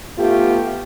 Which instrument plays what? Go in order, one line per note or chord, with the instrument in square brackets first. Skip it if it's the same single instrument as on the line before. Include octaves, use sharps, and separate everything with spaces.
[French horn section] A3 B3 F4 G4